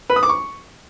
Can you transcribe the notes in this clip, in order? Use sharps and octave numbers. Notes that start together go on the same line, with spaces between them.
B4
D#6
D6
C#6